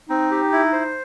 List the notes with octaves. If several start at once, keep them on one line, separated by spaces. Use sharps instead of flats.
C4 D#4
G4
E4
C5